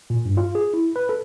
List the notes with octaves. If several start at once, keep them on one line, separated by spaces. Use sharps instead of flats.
A#2
G2
F4
G#4
E4
B4
A4